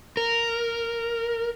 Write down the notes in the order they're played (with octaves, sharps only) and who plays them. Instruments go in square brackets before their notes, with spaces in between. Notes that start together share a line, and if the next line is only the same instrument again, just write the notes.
[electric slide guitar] A#4